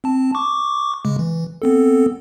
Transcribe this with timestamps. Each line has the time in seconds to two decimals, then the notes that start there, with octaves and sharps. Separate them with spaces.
0.04 C4 A5
0.35 C#6 D6
1.05 C#3 G#3
1.19 E3
1.62 B3 C4 A4